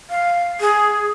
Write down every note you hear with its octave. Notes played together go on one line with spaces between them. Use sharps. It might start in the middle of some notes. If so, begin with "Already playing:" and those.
F5
G#4